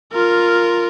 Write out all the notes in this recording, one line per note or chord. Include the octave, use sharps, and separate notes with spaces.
F4 A#4